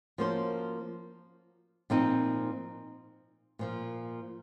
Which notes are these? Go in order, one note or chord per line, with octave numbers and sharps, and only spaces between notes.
F3 A#3 C#4 F#4 C5
A#2 F3 C4 D#4
A#2 F3 A#3